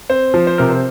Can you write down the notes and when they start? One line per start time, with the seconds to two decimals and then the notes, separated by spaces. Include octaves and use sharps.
0.10 C4 C5
0.34 F3
0.47 C5
0.58 C3 A#4
0.70 C5